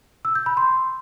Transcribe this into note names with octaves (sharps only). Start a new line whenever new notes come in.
E6
G6
B5
C6